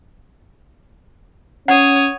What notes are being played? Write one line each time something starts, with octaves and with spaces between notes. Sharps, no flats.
C#4 C#5 F#5 D#6